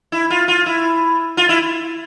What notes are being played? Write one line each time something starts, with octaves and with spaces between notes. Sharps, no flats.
E4
F4
F4
E4
F4
E4